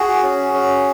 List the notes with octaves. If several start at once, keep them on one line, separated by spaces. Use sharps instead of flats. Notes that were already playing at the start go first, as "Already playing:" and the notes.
Already playing: F#4 G#4
C#4
C#4